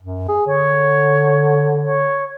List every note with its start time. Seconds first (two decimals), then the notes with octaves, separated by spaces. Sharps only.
0.03 F#2
0.28 G#4
0.47 D3 C#5
1.84 C#5